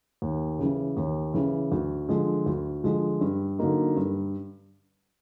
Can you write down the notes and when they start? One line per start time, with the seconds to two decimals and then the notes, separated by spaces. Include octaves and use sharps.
0.22 D#2
0.59 C#3 E3
0.97 D#2
1.34 C#3 E3
1.72 D2
2.09 D3 F3 G#3
2.46 D2
2.84 D3 F3 G#3
3.21 G2
3.59 D3 F#3 A#3 D#4
3.96 G2